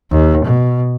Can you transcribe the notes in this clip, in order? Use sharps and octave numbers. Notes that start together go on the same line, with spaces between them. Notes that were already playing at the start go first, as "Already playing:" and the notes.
D#2
B2